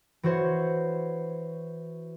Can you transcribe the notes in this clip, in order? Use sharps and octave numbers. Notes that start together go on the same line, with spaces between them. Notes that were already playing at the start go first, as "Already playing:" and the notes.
E3 F#4 C5 C#5